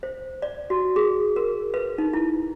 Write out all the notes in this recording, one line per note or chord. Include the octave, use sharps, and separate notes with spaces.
C5
D5
F#4
G#4
A#4
B4
D#4
E4